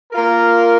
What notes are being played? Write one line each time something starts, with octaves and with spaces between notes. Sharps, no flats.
A#3 F4 A#4